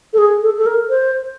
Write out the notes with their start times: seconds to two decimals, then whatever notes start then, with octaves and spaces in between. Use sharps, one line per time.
0.13 A4
0.18 G#4
0.43 A4
0.57 A4
0.66 A#4
0.90 C5